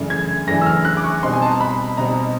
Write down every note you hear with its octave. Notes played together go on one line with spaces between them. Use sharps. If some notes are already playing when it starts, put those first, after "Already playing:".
Already playing: F#2 C#3 E3 A3 D4
G#6
F#2 C#3 E3 A3 D4 A#6
E6
F6
F#6
D6
C#6
B2 G3 C4 D#4 C6
G#5
A5
A#5
B5
B2 G3 C4 D#4 A#5